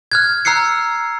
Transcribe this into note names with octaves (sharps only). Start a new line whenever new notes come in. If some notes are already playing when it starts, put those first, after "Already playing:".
F6 F#6 G#6
A#5 E6 F#6 C7 C#7